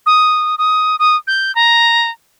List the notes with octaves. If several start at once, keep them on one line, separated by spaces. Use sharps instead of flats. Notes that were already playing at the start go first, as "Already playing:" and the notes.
D#6
D#6
D#6
G6
A#5